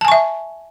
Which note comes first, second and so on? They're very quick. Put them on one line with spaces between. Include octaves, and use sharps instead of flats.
A5 G#5 C#6 E5